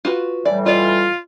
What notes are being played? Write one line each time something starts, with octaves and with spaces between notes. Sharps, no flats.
F4 F#4 B4
A2 E3 G3 D5
F4 D5 D#5